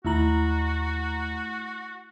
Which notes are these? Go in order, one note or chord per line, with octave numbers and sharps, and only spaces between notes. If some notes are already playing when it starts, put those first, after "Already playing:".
D#2 A3 E4 F#4 A#5 F#7